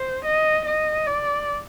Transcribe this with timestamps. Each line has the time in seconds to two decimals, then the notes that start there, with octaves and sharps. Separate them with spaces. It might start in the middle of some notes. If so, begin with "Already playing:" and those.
Already playing: C5
0.25 D#5
0.65 D#5
1.06 D5